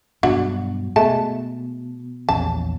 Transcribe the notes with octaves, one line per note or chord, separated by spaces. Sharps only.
G2 B2 F#3 D4 F#4
B2 G#3 A3 A5
A#1 E2 C#4 A5